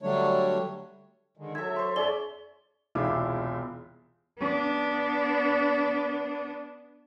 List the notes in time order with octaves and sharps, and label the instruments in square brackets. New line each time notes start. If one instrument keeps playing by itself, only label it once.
[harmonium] D3 F#3 G3 A3 D4 C#5
D3 D#3 G#3
[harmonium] F#3 E5 [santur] A4 E6 [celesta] G#6
[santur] C5 C#6 [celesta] C6
[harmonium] F2 D4 E5 [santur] G#4 C#5 [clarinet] D5 [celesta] G7
[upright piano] E1 C2 E4 F4 G#4 D6
[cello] B3 D4